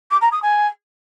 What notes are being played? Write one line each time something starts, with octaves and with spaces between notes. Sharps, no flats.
D6
A#5
D#6
G#5